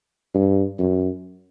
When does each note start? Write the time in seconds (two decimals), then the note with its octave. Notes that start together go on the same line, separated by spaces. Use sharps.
0.34 G2
0.78 F#2